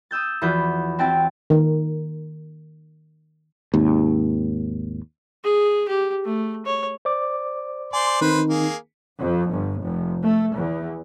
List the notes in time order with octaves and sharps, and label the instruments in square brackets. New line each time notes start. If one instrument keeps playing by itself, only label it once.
[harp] D#6 E6 G6 A6
E2 E3 F3 F#4 B4 G6
C4 E4 F#4 G5 A5 A6
[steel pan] D#3 A#4
[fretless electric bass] G#1 D#2
[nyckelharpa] G#4
G4
A3
C#5
[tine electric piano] C5 D5 D6
[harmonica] C5 D5 C6 [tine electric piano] G#5
[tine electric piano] D#3 C4 D#4 [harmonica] B4 C5
[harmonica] A#3 G#4
[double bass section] F2
G1
F1
A3
E2